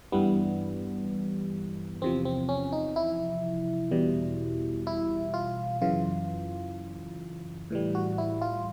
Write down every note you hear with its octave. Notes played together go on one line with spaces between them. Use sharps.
G2 E3 G3 B3
E2 C3 F3 C4
C4
C#4
D#4
E4
E2 B2 G3
E4
F4
F#2 C#3 E3 F4
A2 E3 G3
F#4
E4
F4